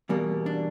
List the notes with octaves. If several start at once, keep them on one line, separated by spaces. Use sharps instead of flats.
E2 B2 G3 A#3
D4